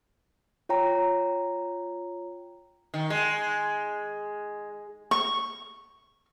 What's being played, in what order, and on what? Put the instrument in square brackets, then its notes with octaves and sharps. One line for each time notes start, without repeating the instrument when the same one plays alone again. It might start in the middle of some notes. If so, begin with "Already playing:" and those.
[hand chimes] F4 C#5 G5 A#5
[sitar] D#3
G#3
[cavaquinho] C#6